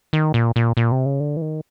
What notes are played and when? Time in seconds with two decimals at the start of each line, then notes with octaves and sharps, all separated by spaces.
0.13 D#3
0.34 A#2
0.56 A#2
0.77 A#2
0.92 C3
1.06 C#3
1.20 D3
1.37 E3
1.42 D#3